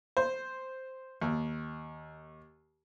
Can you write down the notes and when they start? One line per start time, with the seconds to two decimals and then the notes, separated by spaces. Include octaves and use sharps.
0.17 C5
1.22 D#2